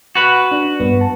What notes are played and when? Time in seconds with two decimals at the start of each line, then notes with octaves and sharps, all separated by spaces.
0.15 F#4 B4
0.52 D4
0.80 G2 B3
1.01 A5